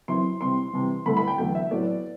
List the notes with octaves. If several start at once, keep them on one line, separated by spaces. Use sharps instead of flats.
F#2 F#3 C4 E4 C6
C3 G3 C4 E4 C6
C3 E3 G3
G2 D3 A3 E4 B5
B5
G5
E2 D3 F#3 A3 G5
E5
A2 F#3 B3 D5